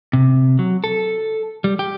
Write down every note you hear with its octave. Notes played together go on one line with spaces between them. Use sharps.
C3
F#3
A4
G3
G4